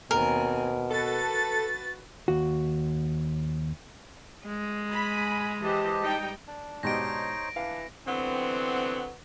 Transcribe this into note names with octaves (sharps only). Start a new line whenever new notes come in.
D#2 B2 C4 A#4 G#5
F#4 A4 B4 A6
D#2 F#4
G#3
G#5 B5
E3 G4 C5 D#5 A5
G3 D#4 G5
D4
G#2 B2 D#4 G4 C5 C#5 A#6 D7
E3 D4 F5
D3 E3 F#3 B3 C4